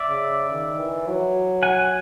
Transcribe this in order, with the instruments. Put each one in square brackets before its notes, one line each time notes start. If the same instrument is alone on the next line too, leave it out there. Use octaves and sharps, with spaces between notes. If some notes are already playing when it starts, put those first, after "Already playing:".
Already playing: [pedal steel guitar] D5 E5
[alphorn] C#3
D#3
E3
F#3
[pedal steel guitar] F#5 G#5